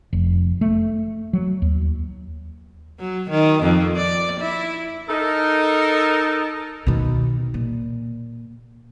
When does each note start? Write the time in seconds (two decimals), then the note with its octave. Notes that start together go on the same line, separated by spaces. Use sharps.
0.13 F1
0.61 A3
1.33 F#3
1.62 D#2
2.99 F#3
3.30 D#3
3.64 F2
3.96 D5
4.40 E4
5.09 D#4 A4 A#4
6.86 B2 D#3
7.54 A#2